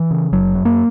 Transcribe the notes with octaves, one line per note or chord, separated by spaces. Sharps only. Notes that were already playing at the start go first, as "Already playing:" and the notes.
Already playing: E3
C#3
F#1 F#3
F#2
A#3